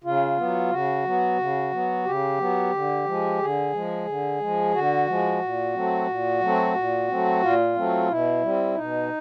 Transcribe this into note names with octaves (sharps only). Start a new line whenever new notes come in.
C#3 F4
F#3 B3
C#3 F#4
F#3 B3
C#3
F#3 B3
C#3 G4
F#3 B3
D3
F3 G#3
D3 G#4
F3 G#3
D3
F3 G#3
D3 F#4
F3 G#3
A#2
F#3 A3 C4
A#2
F#3 A3 C4
A#2
F#3 A3 C4
A#2 F4
F#3 A3 C4
B2 E4
G3 C4
B2 D#4